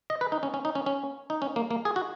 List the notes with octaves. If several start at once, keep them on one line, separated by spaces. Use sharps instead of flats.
D#5
B4
D#4
C#4
C#4
D#4
C#4
C#4
D#4
C#4
A#3
A#3
G#4
F#4